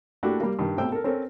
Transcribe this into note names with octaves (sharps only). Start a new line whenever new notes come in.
A3 A#3 D4 E4 F#4 G4
G3 A#3
G2 D#3
G#1 B2 A3 C5 G5 E6
A4 A#4
C4 C#4 A4 A#4